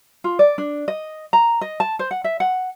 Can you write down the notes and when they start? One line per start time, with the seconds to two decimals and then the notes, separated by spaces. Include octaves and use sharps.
0.24 F4
0.39 D5
0.58 D4
0.88 D#5
1.33 A#5
1.61 D#5
1.80 A5
1.99 C5
2.11 F#5
2.24 E5
2.40 F#5